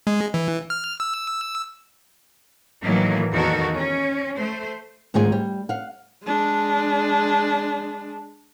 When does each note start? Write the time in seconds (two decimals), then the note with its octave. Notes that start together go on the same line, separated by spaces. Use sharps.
0.07 G#3
0.34 E3
0.70 F6
1.00 E6
2.82 A2 D#3 E3 F#3 A#3
3.32 E2 D#3 A#3 F#4 A4 A#4
3.76 C#4
4.36 A3 C5
5.14 D2 G#2 D#3 F4 G#4 G#5
5.32 G3
5.69 F5 F#5
6.23 G#3 D4